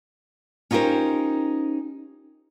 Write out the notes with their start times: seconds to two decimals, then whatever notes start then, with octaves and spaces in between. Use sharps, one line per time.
0.71 C#4 D#4 F4 G4 A#4 C5